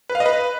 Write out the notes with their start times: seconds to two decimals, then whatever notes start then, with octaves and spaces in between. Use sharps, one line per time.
0.10 B4
0.15 F5
0.20 D#5
0.26 B4